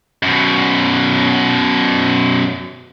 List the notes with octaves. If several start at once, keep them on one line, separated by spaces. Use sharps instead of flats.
F#2 B2